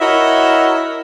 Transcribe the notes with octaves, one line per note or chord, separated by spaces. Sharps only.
E4 F#4 A#4 C#5 D#5 E5